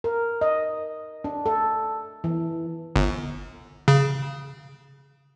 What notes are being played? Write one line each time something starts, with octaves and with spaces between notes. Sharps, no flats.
A#4
D#5
D4
A4
E3
G1
C#3